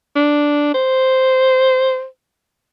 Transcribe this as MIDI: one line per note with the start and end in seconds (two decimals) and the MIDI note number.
0.16 0.70 62
0.74 2.05 72